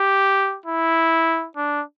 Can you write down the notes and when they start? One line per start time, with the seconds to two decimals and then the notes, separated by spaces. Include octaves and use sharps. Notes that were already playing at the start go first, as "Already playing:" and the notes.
Already playing: G4
0.66 E4
1.56 D4